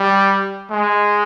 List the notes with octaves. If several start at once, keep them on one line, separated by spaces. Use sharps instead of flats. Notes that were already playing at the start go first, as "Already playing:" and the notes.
Already playing: G3
G#3